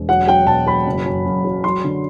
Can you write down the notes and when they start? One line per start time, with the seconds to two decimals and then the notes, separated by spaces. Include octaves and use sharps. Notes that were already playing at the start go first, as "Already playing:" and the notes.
Already playing: E1
0.09 F#3 F#5
0.28 F#3 G5
0.47 B2 A5
0.66 F#3 B5
0.87 F#1
1.06 F#2
1.26 F#2
1.44 F#3
1.64 F#3 C6
1.84 D3